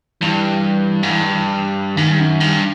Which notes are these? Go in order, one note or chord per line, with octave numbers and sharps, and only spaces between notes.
G2 E3
G#2
G2
G#2 D#3
G2
F#2
G2